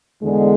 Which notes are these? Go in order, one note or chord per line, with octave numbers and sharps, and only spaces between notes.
E2 D3 G#3